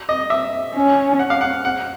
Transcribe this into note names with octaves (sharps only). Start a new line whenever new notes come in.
D#5
E5
C#4
F#5
F5
F#5
F#5